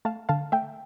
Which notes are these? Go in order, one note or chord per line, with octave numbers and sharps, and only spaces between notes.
A3 F5 A5
D3 F5 A5
A3 E5 G5